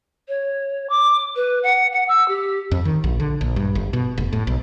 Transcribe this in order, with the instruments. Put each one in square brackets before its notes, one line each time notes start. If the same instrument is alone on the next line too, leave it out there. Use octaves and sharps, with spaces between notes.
[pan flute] C#5
D6
B4
F#5
F#5
E6
G4
[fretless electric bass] F2
D#3
A#1
D3
A#1
G2
G1
B2
F1
A2
B1